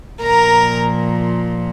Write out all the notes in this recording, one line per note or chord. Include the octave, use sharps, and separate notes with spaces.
A#2 F3 A#4 A#5